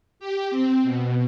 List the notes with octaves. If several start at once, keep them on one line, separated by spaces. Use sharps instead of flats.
G4
C4
B2